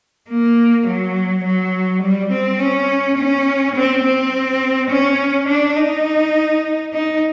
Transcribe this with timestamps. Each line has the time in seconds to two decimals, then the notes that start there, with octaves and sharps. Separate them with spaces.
0.29 A#3
0.87 F#3
1.44 F#3
2.03 G3
2.32 C4
2.59 C#4
3.18 C#4
3.76 C4
4.04 C4
4.91 C#4
5.49 D4
5.77 D#4
6.93 D#4